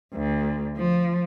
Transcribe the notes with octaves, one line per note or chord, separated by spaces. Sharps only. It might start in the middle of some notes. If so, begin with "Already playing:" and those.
D2
F3